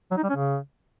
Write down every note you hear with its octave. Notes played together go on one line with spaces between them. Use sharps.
F#3
D#4
G3
C#4
C#3